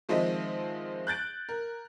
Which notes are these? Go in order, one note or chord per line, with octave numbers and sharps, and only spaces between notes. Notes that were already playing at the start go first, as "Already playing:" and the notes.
D#3 F3 G#3 C4 D#5 E5
F#6 G6 A6 D7
A#4